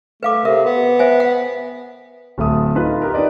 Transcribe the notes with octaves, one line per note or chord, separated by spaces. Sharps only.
A3 B4 F5 D6
C3 A#4 E5
B3
C5 E5 G#5
F#5
D1 A3 E5 D#6
D#4 F4 B4
G4 A#4
D#4 G4 B4 D5 D#5